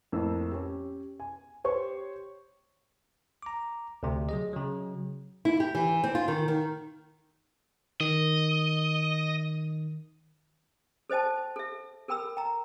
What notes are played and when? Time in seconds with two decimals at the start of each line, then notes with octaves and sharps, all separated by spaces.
0.12 F2 A2 A#3 E6
0.52 C#4 G4
1.20 G#5
1.64 G4 C5 C#5 C#6
3.42 A#5 D6
4.03 D2 C3
4.29 F#3 G#4 D#5
4.53 C#3 F#3
5.45 E4
5.60 G4
5.75 E3
6.04 C4
6.15 F4
6.28 D#3
6.48 D#3
8.00 D#3 D#5
11.10 A4 C5 D#5 G5 A5
11.56 A4 E5
12.08 A4 A#4 G5 B5 E6
12.37 G5 A#5